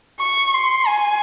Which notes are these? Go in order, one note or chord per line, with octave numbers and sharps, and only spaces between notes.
C#6
C6
G#5